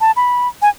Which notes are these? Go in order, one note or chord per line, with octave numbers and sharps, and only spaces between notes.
A5
B5
G#5